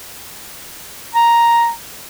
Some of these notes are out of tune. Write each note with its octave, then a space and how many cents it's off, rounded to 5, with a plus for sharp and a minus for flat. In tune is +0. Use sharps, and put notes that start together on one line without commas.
A#5 +5